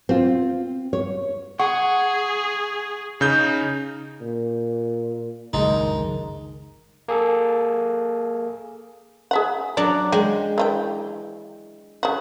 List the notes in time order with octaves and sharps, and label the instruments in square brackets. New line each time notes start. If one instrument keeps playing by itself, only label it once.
[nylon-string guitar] C4 F4
C#5
[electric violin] G#4 [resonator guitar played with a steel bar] F#5 [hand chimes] C#6
[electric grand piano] C#3 G6 [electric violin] D#4
[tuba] A#2
[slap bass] F#1 C#2 G2 [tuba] D#3 [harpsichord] G#3 D#4
[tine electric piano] A#3 G#4 A4
[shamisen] G#4 E5 F#5
[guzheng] F#3 D4 [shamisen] D5
[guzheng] G#3 [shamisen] G5
[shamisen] E3 F4 G5
C#3 F#4